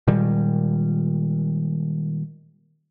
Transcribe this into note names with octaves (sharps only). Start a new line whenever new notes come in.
A#2 D#3 G3 G#3